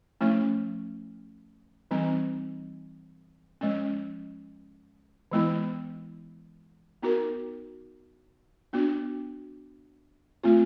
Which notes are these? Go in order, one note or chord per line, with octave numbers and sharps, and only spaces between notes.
F3 A3 C#4 E4
E3 G3 C4 D#4
F3 G#3 C#4
E3 G#3 B3 E4
B3 D#4 F#4 A#4
B3 D4 F#4
A3 C4 F4